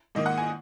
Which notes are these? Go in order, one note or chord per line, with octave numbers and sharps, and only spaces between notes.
G#2 D#3 A#3 D#5
F#5
G#5